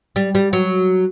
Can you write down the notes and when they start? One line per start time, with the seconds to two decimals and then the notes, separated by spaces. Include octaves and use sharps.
0.16 G3
0.35 G3
0.53 F#3